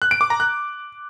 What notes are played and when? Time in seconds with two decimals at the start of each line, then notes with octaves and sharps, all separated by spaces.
0.02 F#6
0.11 D7
0.21 D6
0.30 A#5
0.40 F#6